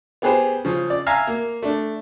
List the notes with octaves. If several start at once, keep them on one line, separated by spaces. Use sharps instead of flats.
B3 G4 G#4 B4 C5
C#3 F3
D5
E5 F5 G#5 A#5
A#3
A3 D4